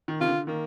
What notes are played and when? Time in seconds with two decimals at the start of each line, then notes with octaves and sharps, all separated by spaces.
0.08 D#3
0.20 C3 F4
0.27 D3
0.47 D#3 A#3